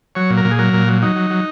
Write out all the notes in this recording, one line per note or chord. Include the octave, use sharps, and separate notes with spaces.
F#3 C#5
A#2
A#4
A#2
G#4
F#3 A#4
A#2
F#3
F#3 D#4
F#3
F#3